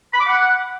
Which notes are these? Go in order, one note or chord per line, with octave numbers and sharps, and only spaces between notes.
B5
D6
F#5